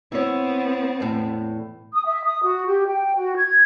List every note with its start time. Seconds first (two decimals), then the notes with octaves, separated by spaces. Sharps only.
0.12 B3 C4 E4 C#5
1.00 E2 A2
1.93 D#6
2.05 E5
2.24 D#6
2.43 F#4
2.66 G4
2.87 G5
3.16 F#4
3.37 G#6